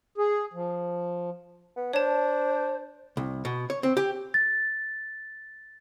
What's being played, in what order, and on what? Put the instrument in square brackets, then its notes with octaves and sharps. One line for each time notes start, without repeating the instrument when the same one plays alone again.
[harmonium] G#4
F3
[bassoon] B3
[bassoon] D4 [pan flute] C5 [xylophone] C#5 A5
[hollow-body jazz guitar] C2
B2
C#5
C4
G4
[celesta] A6